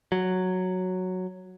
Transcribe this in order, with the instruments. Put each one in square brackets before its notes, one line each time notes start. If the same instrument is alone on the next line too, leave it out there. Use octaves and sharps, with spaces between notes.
[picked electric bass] F#3